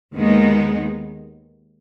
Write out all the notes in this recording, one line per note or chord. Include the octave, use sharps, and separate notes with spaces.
D#2 D#3 G#3 B3 D#4